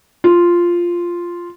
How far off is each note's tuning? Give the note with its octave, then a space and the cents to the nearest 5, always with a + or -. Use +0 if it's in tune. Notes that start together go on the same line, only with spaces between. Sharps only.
F4 -5